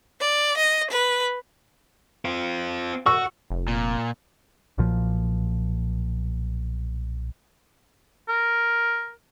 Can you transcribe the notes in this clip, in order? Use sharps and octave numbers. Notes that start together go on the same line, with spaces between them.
D5
D#5
B4
C4 F4
F#4 C#6 E6
F1
A#2
B1 A#2 F3
A#4